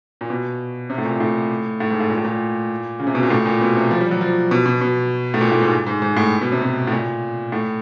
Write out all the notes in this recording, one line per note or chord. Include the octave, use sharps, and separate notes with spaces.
A#2
B2
C3
A2
A#2
A2
A2
G#2
A2
A#2
A2
A#2
C#3
C3
B2
A#2
A2
A#2
B2
C3
F3
G3
F#3
F3
B2
B2
B2
A2
A#2
A2
G#2
G#2
G#2
A2
B2
C3
B2
A2
A#2
A2